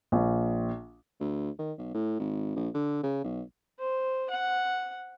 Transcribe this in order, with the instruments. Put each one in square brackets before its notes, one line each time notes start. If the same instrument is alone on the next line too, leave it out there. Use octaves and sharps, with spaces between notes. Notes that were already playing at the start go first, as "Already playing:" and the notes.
[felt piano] A#1
[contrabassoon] D2
D#3
B1
A2
G#1
A#1
D3
C#3
B1
[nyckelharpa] C5
F#5